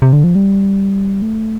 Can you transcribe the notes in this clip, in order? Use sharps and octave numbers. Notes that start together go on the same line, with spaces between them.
C3
D3
F3
G3
A3